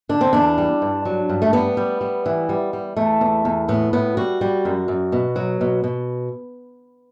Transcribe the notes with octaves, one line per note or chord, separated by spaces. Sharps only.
D3 D4
C4
E2 D4
G3
G2
F#3
G2
A3
G3 B3
G3
G3
E3
G3
G3
E2 A3
E2
E2
A2 B3
A2 B3
G3 F#4
G3
F#2
F#2
B2
F#3
B2
B2